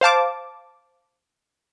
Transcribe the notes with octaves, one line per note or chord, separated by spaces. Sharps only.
C5 F5 A5 D6